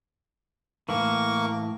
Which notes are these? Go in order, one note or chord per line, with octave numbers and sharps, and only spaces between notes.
A2 E3 A#3 A#4 C#6